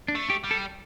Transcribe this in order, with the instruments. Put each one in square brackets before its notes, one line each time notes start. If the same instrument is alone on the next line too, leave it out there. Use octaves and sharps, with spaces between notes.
[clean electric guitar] D4
[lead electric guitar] A3
[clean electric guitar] G4
[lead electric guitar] G3
[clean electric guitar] A4